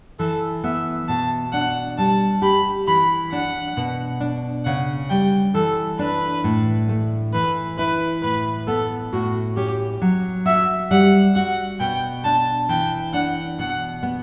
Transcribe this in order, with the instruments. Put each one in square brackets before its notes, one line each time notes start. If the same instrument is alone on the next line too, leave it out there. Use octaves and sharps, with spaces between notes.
[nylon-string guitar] E3 [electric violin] A4
[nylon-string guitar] B3 [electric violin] E5
[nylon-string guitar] B2 [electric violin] A5
[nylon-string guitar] D4 [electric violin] F#5
[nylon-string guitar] G3 [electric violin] A5
[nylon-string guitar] G4 [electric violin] B5
[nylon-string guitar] E3 [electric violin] B5
[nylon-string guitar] D4 [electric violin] F#5
[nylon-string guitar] B2
D4
[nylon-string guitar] C#3 [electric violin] F#5
[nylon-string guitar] G3 [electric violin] G5
[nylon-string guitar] E3 [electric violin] A4
[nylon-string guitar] D4 [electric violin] B4
[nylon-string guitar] A2
A3
[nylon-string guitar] E3 [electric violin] B4
[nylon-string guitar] E4 [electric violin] B4
[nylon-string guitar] A2 [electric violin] B4
[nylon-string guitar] B3 [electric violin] A4
[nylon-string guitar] A2 [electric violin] F#4
[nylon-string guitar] C#4 [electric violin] G4
[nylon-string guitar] F#3
[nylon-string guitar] F#4 [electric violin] E5
[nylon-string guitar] G3 [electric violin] F#5
[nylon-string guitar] F#4 [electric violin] F#5
[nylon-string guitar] B2 [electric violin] G5
[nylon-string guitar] D4 [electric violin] A5
[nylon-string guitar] E3 [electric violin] G5
[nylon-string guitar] D4 [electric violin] F#5
[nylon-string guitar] B2 [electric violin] F#5
[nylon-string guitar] B3